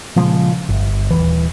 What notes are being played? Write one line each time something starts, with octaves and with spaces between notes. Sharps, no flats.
A#2 C#3 F3 G#3
G1
D#1 C2 E3